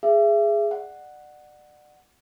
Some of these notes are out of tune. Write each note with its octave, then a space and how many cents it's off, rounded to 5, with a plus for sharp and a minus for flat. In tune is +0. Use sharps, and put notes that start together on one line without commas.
G#4 +0 E5 +30
D5 +30 F#5 +0